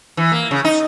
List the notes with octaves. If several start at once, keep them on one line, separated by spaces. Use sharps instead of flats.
E3
A#3
C#3
D#4